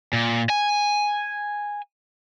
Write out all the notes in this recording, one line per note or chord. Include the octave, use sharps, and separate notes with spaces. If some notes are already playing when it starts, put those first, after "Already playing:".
A#2
G#5